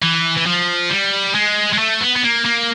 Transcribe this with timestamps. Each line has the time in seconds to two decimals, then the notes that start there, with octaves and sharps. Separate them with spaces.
0.02 E3
0.37 E3
0.46 F3
0.90 G3
1.35 G#3
1.73 G#3
1.79 A3
2.01 B3
2.16 B3
2.24 A#3
2.45 A#3